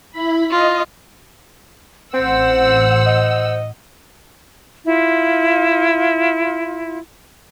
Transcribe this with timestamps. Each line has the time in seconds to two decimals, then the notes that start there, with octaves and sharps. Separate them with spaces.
0.11 E4 B5
0.51 F4 D#5
2.14 A1 C4 C5 F#5 E6
3.06 D#5
4.86 E4 F4